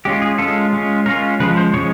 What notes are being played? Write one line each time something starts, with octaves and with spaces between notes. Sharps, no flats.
G#3 C#4 F4 G4
G#4
G#3 C#4 F4 A4
G#3 C#4 F4
G#3 C#4 F4 A#4
C#3 F3 G#3 B4
C5
C#3 F3 G#3 C#5